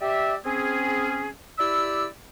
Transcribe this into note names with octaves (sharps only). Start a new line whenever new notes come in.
G4 D5 E5
C4 C#4 G#4
E4 G4 D5 B5 E6